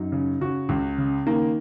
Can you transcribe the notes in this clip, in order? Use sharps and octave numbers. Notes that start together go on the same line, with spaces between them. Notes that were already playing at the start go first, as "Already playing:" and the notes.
Already playing: F#2 D#4
C#3
C#3 F#4
C#2
C#3
D#3 A#3